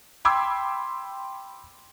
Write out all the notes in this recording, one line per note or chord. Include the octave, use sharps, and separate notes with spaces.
G5 B5 C6 D6 E6 G#6